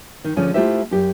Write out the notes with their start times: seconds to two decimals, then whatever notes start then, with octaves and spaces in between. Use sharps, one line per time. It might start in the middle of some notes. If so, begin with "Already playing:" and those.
0.24 D#3
0.37 D2 D3 F3 C#4 G#4
0.54 A3 E4 F4 G4 C5 E5
0.91 F#2 G4